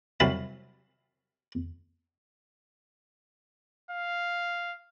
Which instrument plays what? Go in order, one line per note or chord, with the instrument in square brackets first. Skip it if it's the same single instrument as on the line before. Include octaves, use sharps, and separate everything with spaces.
[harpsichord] C2 C3 F#3 F5 A5 B5
[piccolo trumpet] F5